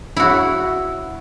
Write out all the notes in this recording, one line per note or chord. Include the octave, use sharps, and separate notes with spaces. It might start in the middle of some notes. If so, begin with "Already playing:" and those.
E4 F#4